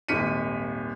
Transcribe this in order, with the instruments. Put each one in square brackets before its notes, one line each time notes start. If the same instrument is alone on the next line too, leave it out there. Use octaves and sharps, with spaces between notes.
[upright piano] D#1 G#1 F6 B6 C#7 D#7